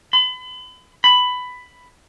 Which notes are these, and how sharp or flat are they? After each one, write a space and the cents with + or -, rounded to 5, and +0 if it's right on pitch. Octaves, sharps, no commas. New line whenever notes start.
B5 +35
B5 +10